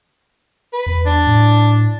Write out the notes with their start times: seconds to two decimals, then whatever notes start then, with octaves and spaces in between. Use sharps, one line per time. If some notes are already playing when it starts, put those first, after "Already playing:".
0.73 B4
0.87 E2
1.06 D4
1.27 A2